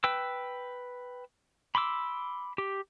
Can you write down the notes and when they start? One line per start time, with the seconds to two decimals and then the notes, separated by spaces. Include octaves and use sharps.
0.04 B4 G5 E6
1.75 B5 C6 D6 E6
2.58 G4